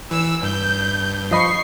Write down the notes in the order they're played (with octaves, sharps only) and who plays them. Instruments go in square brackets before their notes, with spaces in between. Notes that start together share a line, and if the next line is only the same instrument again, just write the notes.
[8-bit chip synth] E3 [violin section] E6
[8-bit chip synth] G2 [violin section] G6
[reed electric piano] F3 D#5 B5 [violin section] C#6 C7